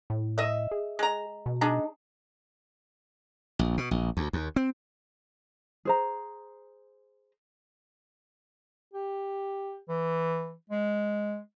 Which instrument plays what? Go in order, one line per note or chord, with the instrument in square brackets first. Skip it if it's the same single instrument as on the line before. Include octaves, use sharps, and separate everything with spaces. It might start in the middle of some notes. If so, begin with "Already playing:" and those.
[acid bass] A2
[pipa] D#5 E5
[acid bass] G#4
[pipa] G#3 A#5
[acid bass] B2
[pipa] G#3 D4 D#4
[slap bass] A#1
B2
A#1
D2
D#2
C4
[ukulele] G#4 C5 A#5
[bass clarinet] G4
E3
G#3